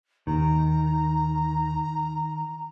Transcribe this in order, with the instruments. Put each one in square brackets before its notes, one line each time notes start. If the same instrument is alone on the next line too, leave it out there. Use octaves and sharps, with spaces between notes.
[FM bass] D#2 [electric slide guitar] D#3 [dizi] A#5